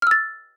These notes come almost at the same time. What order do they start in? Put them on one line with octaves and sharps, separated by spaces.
F6 E6 A6